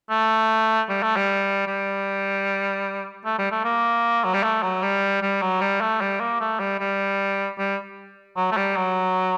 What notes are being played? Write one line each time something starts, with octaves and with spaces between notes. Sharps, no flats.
A3
G3
A3
G3
G3
A3
G3
A3
A#3
F#3
G3
A3
F#3
G3
G3
F#3
G3
A3
G3
A#3
A3
G3
G3
G3
F#3
A3
G3
F#3